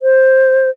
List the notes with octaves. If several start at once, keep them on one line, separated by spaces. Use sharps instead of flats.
C5